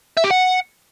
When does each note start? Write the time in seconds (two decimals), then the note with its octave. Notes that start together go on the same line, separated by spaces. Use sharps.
0.17 E5
0.24 G4
0.30 F#5